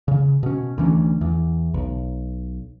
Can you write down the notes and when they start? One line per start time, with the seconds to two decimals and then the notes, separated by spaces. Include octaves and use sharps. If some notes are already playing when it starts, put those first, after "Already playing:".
0.08 C#3
0.43 B2 C#4
0.78 D2 E3 C#4
1.21 E2
1.74 B1